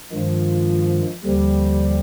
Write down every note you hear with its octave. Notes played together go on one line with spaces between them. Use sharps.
G2 D#3 F3 G#3
D#2 D3 F3 G3